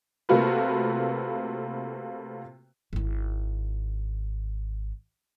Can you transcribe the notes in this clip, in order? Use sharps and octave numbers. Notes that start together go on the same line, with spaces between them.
C3 A3 A#3 F4 F#4 B4
G#1 E4